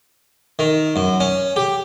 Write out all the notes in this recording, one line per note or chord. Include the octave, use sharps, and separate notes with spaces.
D#3
F#2
C#4
G4